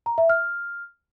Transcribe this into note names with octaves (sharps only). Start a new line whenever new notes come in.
A#5
E5
F6